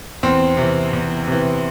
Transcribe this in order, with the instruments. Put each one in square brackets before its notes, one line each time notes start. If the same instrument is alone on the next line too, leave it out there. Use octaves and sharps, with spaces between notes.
[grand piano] E2 C4
C3 E3
E2
C3 E3